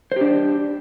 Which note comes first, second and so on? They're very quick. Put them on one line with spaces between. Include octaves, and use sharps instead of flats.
C5 G4 D4